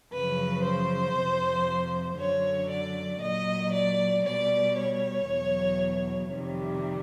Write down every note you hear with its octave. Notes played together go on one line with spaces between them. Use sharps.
F#2 C#3 F3 B4
C5
F2 C3 F3
F#2 D3 F#3 C#5
D5
A#2 F#3 D#5
D5
B2 G3 D5
C#5
E2 B2 F#3
F2 C3 D#3 G3